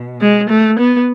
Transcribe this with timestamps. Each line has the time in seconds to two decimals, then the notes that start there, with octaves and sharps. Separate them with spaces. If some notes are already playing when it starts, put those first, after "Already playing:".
Already playing: B2
0.20 G#3
0.49 A3
0.79 B3